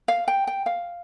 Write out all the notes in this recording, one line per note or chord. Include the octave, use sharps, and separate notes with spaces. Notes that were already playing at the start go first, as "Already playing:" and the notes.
F5
G5
G5
F5